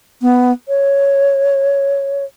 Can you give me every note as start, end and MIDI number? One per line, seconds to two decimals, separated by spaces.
0.22 0.51 59
0.68 2.25 73